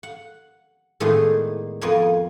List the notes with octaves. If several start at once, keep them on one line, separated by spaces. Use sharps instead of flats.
F#5
A2 D#3 G#3 B3 D4 E4
F2 F3 B3 A#4 G#5